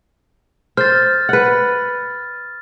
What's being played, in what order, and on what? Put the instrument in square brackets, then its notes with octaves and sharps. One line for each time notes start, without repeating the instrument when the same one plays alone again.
[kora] C5 [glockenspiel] F6 A6
[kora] B4 F#5